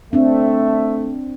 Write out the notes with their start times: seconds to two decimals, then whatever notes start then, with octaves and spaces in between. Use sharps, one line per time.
0.13 A3 C4 D4 E5